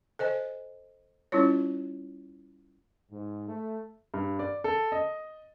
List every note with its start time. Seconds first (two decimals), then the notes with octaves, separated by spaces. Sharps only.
0.19 A4 C5 D#5 G#5
1.32 G3 C#4 E4 F4 C#5
3.11 G#2
3.48 A3
4.14 G2
4.39 D5
4.64 A4
4.92 D#5